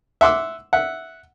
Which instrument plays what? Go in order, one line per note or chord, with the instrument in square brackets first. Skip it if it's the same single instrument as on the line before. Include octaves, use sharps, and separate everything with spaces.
[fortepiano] E5 F#5 C6 D6 E6
E5 F#5